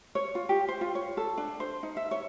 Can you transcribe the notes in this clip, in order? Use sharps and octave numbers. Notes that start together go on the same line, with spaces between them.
C#5
F4
G4
C5
F4
C#5
A4
D4
C5
D#4
E5
C#5